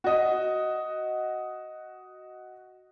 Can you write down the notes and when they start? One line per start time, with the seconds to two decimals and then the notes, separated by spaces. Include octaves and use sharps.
0.04 F#4 D#5